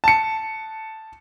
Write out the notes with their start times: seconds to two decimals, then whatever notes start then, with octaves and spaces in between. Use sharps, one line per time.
0.04 A5 C#7